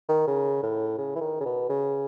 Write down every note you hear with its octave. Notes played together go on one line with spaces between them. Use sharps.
D#3
C#3
A2
C#3
E3
D#3
C#3
B2
C#3